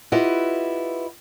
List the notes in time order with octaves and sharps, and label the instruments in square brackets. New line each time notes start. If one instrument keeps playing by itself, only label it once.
[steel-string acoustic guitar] E4 F4 G4 B4 D#5 F#5